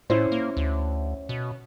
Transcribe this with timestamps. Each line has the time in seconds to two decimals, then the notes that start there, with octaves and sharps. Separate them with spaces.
0.10 A2 C#4 E4 C5
0.32 A#3
0.57 D2
1.29 B2